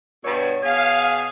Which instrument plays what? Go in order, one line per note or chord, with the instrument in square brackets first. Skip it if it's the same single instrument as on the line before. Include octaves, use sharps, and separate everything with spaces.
[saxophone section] G2 B2 [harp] C#5
[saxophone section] B2 G#4 [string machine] F5